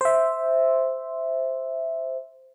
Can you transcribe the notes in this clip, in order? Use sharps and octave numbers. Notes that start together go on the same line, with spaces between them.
C5 E5